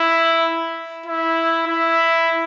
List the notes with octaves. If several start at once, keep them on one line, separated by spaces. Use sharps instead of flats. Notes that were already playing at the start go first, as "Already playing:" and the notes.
Already playing: E4
E4
E4